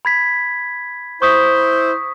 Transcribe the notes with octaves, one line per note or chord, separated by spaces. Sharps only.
B5 G#6 B6
E4 C5 C#6 D#6 B6